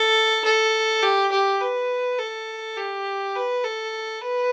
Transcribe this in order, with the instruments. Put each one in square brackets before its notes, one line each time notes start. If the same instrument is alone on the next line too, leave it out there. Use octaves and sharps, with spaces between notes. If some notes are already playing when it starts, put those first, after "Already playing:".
Already playing: [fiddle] A4
A4
G4
G4
B4
A4
G4
B4
A4
B4